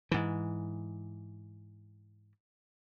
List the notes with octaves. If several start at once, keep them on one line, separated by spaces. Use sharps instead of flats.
G#2 E3